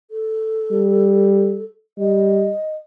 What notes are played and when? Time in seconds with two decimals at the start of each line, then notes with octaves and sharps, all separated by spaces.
0.11 A4
0.72 G3
1.98 G3 D#5